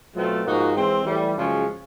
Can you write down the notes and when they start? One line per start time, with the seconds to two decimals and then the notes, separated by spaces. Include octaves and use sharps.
0.15 B2 F#3 A3 C4 F4
0.45 G#2 F3 A#3 D#4 F#4
0.75 E3 G#3 C4
1.05 A2 E3 G3
1.35 F#2 C#3 F3 G#3 C#4